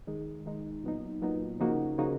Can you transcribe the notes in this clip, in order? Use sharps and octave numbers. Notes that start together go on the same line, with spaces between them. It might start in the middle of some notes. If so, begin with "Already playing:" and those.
D#3 G#3 D#4
D#3 G#3 D#4
A#2 F#3 B3 D#4
A#2 F#3 B3 D#4
C#3 F3 A#3 D#4 F#4
C#3 F3 A#3 D#4 F#4